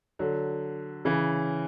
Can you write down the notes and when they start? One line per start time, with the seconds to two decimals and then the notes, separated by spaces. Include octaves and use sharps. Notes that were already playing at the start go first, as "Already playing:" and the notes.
0.19 D3 F#3
1.05 C#3 E3